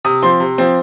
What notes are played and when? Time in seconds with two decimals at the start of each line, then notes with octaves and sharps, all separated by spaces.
0.05 C3 D#6
0.23 F3 C4 C6
0.40 C3
0.58 F3 C4